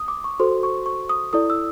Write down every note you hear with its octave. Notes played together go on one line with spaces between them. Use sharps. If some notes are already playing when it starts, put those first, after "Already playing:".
Already playing: D#6
D6
C#6
F#4 A4 C5 C6
C#6
C#6
D#6
E4 A4 D5 D#6
E6